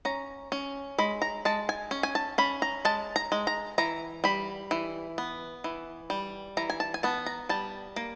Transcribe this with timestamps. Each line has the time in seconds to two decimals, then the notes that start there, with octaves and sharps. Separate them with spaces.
0.05 C#4 A#5
0.52 C#4
0.98 G#3 B5
1.22 A#5
1.45 G#3 A5
1.69 G#5
1.91 C#4
2.03 G#5
2.15 A5
2.38 C#4 B5
2.62 A#5
2.85 G#3 A5
3.16 A#5
3.32 G#3
3.47 A#5
3.78 E3 A#5
4.24 G3 B5
4.71 E3
5.18 B3
5.64 E3
6.10 G3
6.57 E3 A#5
6.70 G#5
6.80 A5
6.94 G#5
7.03 B3 A5
7.26 A#5
7.49 G3 A5
7.96 A#3